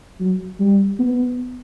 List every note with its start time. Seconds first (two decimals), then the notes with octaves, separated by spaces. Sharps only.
0.20 F#3
0.60 G3
1.00 B3